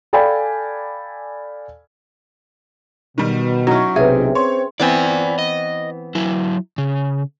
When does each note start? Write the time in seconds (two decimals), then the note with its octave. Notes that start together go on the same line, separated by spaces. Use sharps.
0.13 A4 D5 F5 G5 G#5 B5
3.18 B2 D#3 G3
3.67 F#3 C#4 D#4 E4
3.96 B1 C3 G#4 B4 C#5 E5
4.35 C4 C#5 C6
4.80 E3 B3 C4 D5 G#5
5.39 D#5
6.15 F#3 E4
6.78 C#3